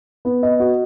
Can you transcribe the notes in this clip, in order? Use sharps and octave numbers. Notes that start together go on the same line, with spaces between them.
B3
D#5
F#4